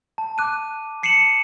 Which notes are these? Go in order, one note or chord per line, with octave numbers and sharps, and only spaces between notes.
A5
D6 F#6 D#7
A5 C7 C#7 D#7 E7 F#7